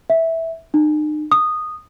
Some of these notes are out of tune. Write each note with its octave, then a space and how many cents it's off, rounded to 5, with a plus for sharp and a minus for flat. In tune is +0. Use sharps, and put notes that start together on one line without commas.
E5 -10
D#4 -40
D#6 -10